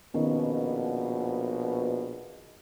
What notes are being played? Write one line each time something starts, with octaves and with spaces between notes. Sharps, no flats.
A#1 B2 D#3 B3 C#4